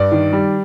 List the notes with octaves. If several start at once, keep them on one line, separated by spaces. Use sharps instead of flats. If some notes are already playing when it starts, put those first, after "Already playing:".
Already playing: G2 D5
D#3
G3